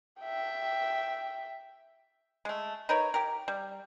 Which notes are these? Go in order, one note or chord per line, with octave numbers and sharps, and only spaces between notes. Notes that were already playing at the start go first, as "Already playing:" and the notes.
E5 G5
G#3 A3
D#4 A#4 B4 C#5
G4 A#4
G3